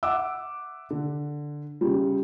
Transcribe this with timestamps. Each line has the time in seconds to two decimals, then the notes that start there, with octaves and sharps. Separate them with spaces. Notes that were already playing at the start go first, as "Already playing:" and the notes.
0.03 E5 F#5 D6 E6
0.90 D3
1.81 C#3 G3